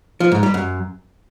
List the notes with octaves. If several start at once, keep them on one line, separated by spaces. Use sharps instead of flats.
F3
G#2
G3
F#2